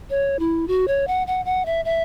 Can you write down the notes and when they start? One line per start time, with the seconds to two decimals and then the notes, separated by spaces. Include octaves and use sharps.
0.10 C#5
0.39 E4
0.68 F#4
0.88 C#5
1.07 F#5
1.27 F#5
1.45 F#5
1.66 E5
1.85 E5